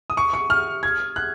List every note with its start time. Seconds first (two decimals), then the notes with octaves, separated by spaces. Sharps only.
0.10 D#6
0.17 C#6
0.33 C#6
0.50 F6
0.83 G#6
1.16 F#6